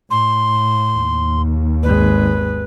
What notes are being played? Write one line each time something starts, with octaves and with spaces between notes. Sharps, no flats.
A2 C6
D#2
G#1 G#3 B4